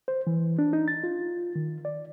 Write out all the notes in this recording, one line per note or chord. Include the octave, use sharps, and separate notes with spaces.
C5
E3
D4
D#4
A6
F4
D#3
D5